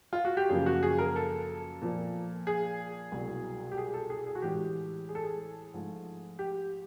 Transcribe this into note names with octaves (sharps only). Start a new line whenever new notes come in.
F4
F#4
G4
F#2 C#3 F3 A#3 G#4
F#4
G#4
A#4
A4
A#2 F3 A#3
G#4
C2 B2 F#3
G4
G#4
A4
G#4
G#4
F#4
A2 E3 G#3 G4
G#4
A4
G#4
G#2 F3 A3
G4